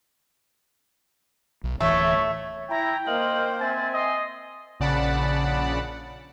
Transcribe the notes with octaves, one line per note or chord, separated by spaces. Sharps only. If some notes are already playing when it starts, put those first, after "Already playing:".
B1
D1 E3 A3 C#5 E5
E4 G5 A#5
A#3 A#4 C5 D#5 F5 F#7
C4 E5 G#5 A6
D#5 C6
A#1 C#3 D5 F#5 A5 B5